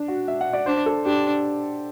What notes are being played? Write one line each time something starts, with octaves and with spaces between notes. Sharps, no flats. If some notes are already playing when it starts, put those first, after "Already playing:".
Already playing: D4
F#4
E5
F#5
D5
D4 C5
A4
D4 G4